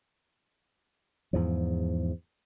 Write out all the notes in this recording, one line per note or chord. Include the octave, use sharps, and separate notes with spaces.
E2 G#2 F3